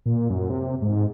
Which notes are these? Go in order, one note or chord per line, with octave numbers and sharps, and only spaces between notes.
A#2
F#2
C3
G#2